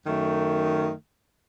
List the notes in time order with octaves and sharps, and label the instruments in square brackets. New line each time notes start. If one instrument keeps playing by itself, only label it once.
[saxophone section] F#2 D#3 A3